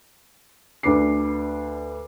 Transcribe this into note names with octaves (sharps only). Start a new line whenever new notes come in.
D2 D4 B4 D6 C7